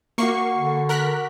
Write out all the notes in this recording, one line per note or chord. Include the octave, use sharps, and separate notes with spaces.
A#3 F#4 C#6 D6 C7
D3
A#4 F#6 B6